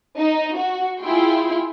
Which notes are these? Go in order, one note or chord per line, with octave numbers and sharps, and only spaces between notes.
D#4
F#4
E4 F4 G#4 G5 C6